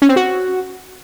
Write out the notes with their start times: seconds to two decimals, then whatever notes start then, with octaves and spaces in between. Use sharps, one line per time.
0.02 C#4
0.09 C4
0.16 F#4